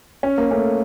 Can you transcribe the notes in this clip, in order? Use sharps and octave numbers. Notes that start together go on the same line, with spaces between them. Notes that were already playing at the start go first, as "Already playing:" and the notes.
C#4
A#3
A3 C#4